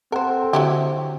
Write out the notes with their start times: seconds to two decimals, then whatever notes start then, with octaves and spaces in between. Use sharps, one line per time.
0.12 C4 A4 A#4 C5 F#5
0.53 D3 F#3 E4 G4